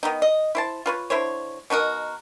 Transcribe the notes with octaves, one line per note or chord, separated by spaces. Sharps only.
D#3 B3 D#4
D#5
E4 C5 A5
F4 B4 C#5
D3 E4 C5 C#5
B2 D#4 F#4 A#4